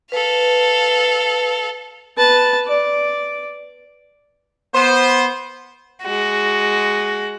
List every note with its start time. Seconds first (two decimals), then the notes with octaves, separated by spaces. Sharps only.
0.12 A4 B4 F5
2.17 B4 A5
2.67 D5
4.75 B3 C5
6.03 G#3 F#4